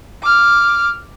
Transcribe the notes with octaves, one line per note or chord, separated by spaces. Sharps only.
D6 F6